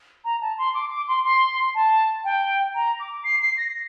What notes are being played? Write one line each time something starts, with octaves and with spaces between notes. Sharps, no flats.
A#5
A5
C6
D6
D6
C6
C6
A5
G5
A#5
D6
C7
C7
A#6